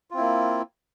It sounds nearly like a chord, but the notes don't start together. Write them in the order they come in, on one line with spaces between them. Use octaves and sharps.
F4 C4 E4 A#3